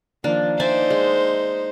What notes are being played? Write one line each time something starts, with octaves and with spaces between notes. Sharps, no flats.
D#3 F3 A#3 D4
D#4 C5 D5 E5 G#5
G#3